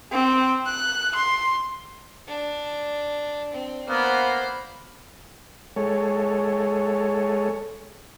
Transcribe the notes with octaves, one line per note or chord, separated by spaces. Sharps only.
C4
F#6
C6
D4
C4
A#3 B3 C5 B5
G#3 A4 C#5